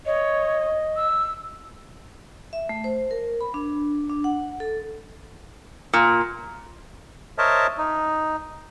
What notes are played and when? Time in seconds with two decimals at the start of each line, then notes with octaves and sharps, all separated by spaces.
0.06 C#5 D#5
0.96 E6
2.53 E5
2.69 A3
2.84 C5
3.11 A#4
3.41 B5
3.54 D4
4.10 D4
4.24 F#5
4.60 A4
5.93 A#2
7.38 A#4 C5 C#5 D#5 E5 A5
7.78 D#4